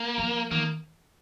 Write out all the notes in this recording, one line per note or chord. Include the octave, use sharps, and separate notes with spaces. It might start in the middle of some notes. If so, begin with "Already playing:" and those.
Already playing: A#3
F3
D#3 A#3